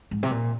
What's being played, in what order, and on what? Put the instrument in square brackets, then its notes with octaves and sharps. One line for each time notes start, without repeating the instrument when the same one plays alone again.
[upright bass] G#2
C3
A#2